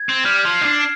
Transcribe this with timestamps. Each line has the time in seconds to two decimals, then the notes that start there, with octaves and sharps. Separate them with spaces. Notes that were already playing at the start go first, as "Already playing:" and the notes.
Already playing: G#6
0.09 C4
0.24 G3 F6
0.45 F3
0.55 C7
0.61 D#4
0.65 D4